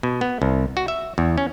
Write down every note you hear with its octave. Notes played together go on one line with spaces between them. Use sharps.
B2
B3
C2
F#4
E5
E2
C#4